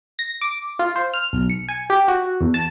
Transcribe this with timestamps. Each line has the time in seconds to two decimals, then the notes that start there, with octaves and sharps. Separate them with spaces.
0.19 A#6
0.41 D6
0.79 F4
0.96 C5
1.14 F6
1.33 B1
1.50 C#7
1.69 G#5
1.90 G4
2.08 F#4
2.41 E2
2.54 A5